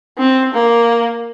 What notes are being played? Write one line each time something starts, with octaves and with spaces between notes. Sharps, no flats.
C4
A#3